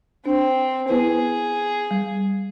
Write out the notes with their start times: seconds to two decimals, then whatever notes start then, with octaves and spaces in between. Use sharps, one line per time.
0.26 C4 D4
0.89 B3 E4 G#4 B4
1.91 G3